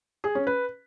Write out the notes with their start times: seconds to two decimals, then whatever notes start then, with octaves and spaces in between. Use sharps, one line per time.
0.24 G#4
0.35 C#4
0.47 B4